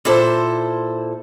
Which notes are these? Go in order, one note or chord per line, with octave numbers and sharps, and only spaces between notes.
A#2 E4 A4 C5